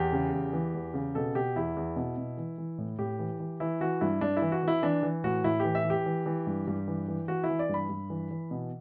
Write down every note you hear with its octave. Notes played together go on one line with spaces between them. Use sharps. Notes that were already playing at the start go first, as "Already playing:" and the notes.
Already playing: E2 G4
C#3
E2
E3
E2
C#3
B2 A4
B2 G4
E2 E4
E2
B2
B2
E3
E3
A2
A2 G4
E3
E3
E3 E4
E3 F#4
G2 E4
G2 D4
E4
E3
F#4
E3 E4
E3 D4
E3
A2 F#4
A2 E4
E3 G4
E5
E3
G4
E3
E3
G2
G2
E3
E3
E3 F#4
E4
E3
D5
G2 B5
G2
E3
E3
B2